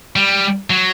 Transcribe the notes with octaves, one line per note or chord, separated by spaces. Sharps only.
G3
F#3